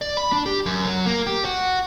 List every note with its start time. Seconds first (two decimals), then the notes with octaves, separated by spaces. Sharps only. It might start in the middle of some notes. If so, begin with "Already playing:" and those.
0.01 D5
0.17 B5
0.32 D4
0.46 G4
0.66 F#2
0.86 F#3
1.06 A#3
1.27 G4
1.45 F#4